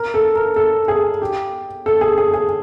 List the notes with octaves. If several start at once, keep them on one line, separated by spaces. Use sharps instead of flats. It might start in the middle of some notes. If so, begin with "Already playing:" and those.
Already playing: A#4
A4
A#4
A4
G#4
G4
A4
G#4
G#4
G#4